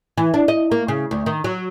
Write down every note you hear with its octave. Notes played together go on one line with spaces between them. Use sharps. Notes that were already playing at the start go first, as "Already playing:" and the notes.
E3
D4
D#5
A#3
C#3
D2
D#3
F#3